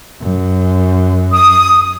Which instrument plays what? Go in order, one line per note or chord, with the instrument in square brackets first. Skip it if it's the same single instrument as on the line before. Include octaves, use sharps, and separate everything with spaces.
[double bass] F#2
[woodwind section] D#6